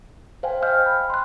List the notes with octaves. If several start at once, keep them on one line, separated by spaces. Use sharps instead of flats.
C5 F5 G5 G#5
D#5 F5 G5 F6 G6
B5
C6 F#6